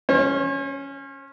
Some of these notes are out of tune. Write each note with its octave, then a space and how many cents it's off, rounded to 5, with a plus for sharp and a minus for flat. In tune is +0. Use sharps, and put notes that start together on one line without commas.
C#4 +0 C#5 -45